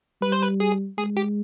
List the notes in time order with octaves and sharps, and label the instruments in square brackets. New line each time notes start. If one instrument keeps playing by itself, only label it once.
[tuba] G3 [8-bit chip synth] B4
[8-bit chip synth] C5
B4
G#4
[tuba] G#3 [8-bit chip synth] G#4
[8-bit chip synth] G4